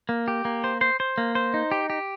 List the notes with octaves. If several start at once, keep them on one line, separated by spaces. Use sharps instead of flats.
A#3
G4
A#3
C5
C5
C5
A#3
C5
D#4
G4
G4